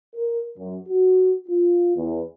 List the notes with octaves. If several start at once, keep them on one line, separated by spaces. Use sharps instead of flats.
A#4
F#2
F#4
F4
E2